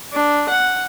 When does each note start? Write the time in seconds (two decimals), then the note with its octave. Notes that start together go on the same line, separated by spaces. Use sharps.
0.12 D4
0.49 F#5